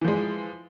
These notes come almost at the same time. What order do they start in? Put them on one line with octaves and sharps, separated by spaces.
E3 F3 G#3